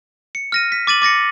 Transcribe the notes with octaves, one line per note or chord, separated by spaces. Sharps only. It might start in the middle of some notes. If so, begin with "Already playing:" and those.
C#7
F6 A#6 D#7
B6
D6 A6 D#7 F#7
D6 A6 A#6 C#7